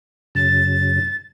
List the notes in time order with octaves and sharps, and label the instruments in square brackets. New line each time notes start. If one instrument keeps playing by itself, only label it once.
[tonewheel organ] F#2 C#3 [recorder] A6